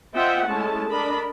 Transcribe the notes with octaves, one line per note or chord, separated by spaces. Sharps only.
C4 F4 D#5 E5 F#5 G5
G#3 A3 C#4 E4 A5
D4 A#4 D#5 B5